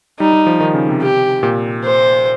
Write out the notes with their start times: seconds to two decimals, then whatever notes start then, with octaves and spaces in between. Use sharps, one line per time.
0.19 G3 D#4
0.33 G3
0.47 F3
0.60 D#3
0.74 C#3
0.89 C3
1.02 G4
1.43 A#2
1.84 C5